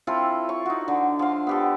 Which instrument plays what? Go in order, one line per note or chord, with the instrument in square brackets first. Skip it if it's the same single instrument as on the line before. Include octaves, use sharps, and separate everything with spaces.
[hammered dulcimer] C4 E4 F4 A4
C#6
D#4 F#4
D3
F3 F5
B3 G4 A4